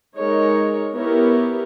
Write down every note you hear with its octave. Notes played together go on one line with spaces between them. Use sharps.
G#3 D#4 A#4 C#5
B3 E4 G4 A#4 C#5